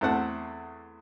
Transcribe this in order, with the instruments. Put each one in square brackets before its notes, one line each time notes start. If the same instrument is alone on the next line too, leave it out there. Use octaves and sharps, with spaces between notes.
[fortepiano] E2 A3 C4 F#5 A5